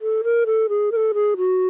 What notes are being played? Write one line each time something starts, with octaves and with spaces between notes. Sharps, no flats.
A4
A#4
A4
G#4
A#4
A4
G#4
F#4